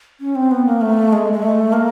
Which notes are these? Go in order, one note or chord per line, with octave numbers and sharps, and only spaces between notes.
C#4
C4
B3
A#3
A3
G#3
G#3
A3
A#3